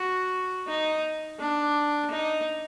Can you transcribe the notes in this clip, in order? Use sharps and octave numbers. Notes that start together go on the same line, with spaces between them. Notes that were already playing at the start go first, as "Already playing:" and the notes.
Already playing: F#4
D#4
D4
D#4